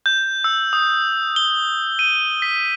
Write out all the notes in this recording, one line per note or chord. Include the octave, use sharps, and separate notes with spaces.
G6
E6
D#6
G7
D#7
B6